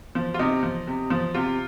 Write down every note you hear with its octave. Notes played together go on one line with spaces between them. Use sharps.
F3
F4
C3 D#4
F3
C3
F3
C3 F4